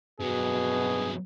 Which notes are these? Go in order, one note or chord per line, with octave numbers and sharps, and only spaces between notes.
G2 B2 F#3 G#4